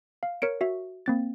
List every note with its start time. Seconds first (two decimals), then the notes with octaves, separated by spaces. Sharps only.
0.23 F5
0.42 A#4 C#5 C#7 D7
0.61 F#4 E5
1.06 A#3 C4 A6